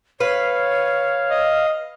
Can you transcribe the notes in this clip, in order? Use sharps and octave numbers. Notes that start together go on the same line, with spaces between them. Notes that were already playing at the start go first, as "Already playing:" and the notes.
B4 C#5 F5
D#5